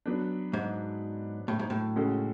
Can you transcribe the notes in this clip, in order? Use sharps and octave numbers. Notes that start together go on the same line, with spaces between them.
F#3 B3 D4
G#2
A2
G#2
A2
C#3 G#3 C#4 F#4 A4